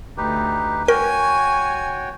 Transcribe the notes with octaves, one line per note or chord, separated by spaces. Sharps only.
D2 D#4 G4 B4
F#4 A#4 C#5 G5 G#5